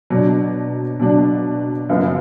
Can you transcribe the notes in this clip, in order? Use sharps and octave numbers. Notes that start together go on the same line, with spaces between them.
B2 F#3 D4
B2 F#3 D4
F#1 F#2 F3 B3